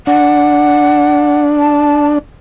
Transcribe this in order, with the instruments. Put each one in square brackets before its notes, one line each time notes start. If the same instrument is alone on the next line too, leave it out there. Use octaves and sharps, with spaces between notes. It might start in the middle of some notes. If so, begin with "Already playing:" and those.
[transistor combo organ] D4 [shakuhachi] F#5
[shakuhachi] A5